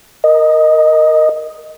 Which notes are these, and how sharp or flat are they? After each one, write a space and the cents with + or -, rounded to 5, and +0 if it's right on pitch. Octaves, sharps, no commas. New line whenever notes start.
A#4 +0 D#5 +0